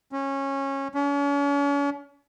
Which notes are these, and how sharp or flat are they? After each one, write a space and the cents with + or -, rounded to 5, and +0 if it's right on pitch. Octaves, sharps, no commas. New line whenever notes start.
C#4 -20
C#4 +40